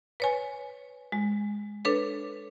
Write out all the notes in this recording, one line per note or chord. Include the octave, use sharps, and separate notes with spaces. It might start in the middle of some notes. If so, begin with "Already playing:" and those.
B4 C#5 G#5
G#3
D4 A4 B4 C#5